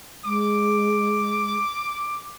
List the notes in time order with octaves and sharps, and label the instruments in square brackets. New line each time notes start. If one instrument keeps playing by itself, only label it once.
[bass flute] G#3 [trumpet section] D6